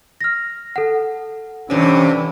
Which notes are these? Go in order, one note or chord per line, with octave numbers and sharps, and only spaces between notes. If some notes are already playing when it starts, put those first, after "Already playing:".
F6 A#6
A4 F#5
G2 C3 E3 C#4